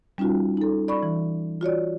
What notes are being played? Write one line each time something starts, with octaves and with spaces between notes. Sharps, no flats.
G3 C#4 D#4 F4 F#4
D#4 A4
D5 B5 C#6
E3
F4 F#4 C#5 D5